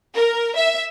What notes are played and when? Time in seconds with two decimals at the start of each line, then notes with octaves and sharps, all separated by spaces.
0.15 A#4
0.57 E5